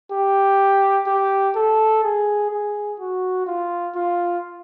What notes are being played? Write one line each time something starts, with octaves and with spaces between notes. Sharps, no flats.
G4
G4
A4
G#4
G#4
F#4
F4
F4